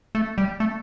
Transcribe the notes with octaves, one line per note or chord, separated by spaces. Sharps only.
A3
G3
A3